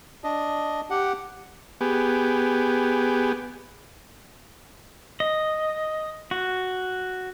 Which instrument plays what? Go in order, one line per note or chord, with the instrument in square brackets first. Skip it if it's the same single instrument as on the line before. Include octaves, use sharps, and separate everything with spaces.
[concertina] D4 D#5
G4 F#5
[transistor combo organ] B3 G4 G#4
[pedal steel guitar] D#5
F#4